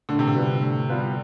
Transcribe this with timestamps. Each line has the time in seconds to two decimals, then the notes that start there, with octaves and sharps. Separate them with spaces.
0.09 A2 D3
0.19 C3
0.28 D3
0.35 G3 B3 F4 B4
0.62 A2
0.89 G3 B3 F4 B4